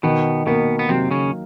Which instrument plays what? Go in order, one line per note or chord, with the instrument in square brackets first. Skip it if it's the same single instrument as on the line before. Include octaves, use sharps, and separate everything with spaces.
[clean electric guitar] B2 B3 [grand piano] D#3
[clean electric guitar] B2 B3 [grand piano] A#3
[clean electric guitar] B3
[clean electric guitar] C3 C4 [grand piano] F#3
[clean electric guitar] C#3 C#4